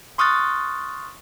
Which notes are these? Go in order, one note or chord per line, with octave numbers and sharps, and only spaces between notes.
C6 C#6 D#6 F6 F#6 A6